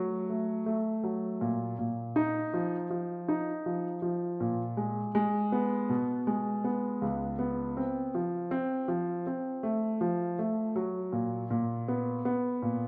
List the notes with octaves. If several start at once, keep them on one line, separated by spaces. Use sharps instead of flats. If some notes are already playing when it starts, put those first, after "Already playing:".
Already playing: F#3 A3
A3
A3
F#3
A#2
A#2
D#4
F3
F3
D#4
F3
F3
A#2
G#3
G#3
B3
B2
G#3
B3
C#2
B3
C4
F3
C4
F3
C4
A3
F3
A3
F#3
A#2
A#2
B3
B3
A#2